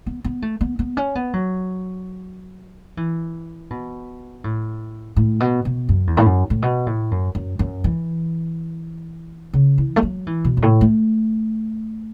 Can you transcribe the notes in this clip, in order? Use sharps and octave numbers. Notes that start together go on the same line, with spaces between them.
B3
B3
A3
B3
B3
C#4
B3
F#3
E3
B2
A2
A2
B2
B2
F#2
E2
A2
F#2
A2
B2
A2
F#2
F#2
F#2
E3
C#3
E3
A3
F#3
E3
B2
F#2
A2
A3